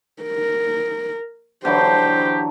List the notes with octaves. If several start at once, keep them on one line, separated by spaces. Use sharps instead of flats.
A#4
D3 E3 F#3 G4 C5